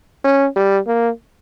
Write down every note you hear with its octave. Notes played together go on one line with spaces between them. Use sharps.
C#4
G3
A#3